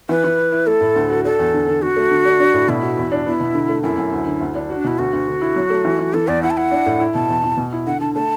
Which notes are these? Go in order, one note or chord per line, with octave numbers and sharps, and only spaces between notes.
E3 B4
E3
E4
E4
A3 A4
A2
D2
F#4
D4 A4
E2
D3
D3
D3 F#4
A3
D3
D4
D4
A2
B2 E4
F#4
E2
D4
B3 E4
B2
D3
A3
F#2 E4
F#2
D2
D3
D2
D4
F#4
D4
B2 E4
D2 F#4
D2
D3
E4
F#3
A3
E3
E3
E3 A4
E2 D5
E4 F#5
A5
E4 F#5
D4
A2
E4
B2 A5
E2
E3
B2
E4
D3 F#5
D3 A5
A3 A5